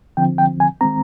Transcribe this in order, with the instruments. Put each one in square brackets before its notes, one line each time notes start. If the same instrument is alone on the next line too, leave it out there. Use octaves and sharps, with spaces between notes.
[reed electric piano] D3 F3 C4 G5
G5
G#5
D#3 G#3 C4 A#5